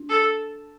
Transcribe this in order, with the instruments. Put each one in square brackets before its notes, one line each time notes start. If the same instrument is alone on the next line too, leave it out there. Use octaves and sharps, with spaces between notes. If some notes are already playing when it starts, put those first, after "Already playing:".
Already playing: [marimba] D4
[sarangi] A4